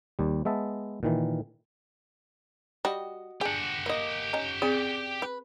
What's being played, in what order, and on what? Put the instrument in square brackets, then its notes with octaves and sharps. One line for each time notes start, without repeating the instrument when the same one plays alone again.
[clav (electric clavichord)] D#2 G3
G#3 B3 E5 A5
A#2 D#3 E3
[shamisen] G3 [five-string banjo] F#4 D#5
[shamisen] D4 G#4 [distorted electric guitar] G4 F#5 [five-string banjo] G5
[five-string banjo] A#3 D#5
[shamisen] C#4 D#4
[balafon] C4 G#4 [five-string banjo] D5
[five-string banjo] B4